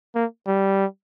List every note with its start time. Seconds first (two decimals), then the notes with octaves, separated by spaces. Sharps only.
0.16 A#3
0.47 G3